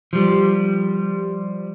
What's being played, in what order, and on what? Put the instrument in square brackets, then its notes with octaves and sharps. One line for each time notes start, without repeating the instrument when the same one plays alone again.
[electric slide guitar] F3 G3